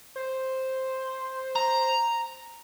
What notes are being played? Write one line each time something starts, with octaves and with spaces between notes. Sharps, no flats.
C5
A#5